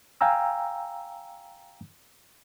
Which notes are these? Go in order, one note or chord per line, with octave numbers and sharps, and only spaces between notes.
F5 G5 G#5 A#5 E6